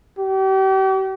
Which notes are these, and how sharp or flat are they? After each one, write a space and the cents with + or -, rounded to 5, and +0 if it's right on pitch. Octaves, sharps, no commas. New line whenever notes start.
G4 -40